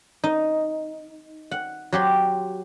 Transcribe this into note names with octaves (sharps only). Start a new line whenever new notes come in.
D#4
F#5
F#3 G4 C6